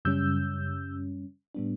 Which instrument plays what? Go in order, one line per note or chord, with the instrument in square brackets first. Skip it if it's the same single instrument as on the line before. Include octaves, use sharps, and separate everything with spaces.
[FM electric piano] F#2 C#3 G3 C#4 E6 G6
A2 G3 B3 D4